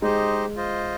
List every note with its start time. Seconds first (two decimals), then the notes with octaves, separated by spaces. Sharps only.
0.02 G#3 D#4 G4 C5 D#5
0.56 F4 C5 D#5